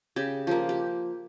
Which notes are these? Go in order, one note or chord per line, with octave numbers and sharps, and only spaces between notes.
C#3 G4
F3 A#3 G4
G4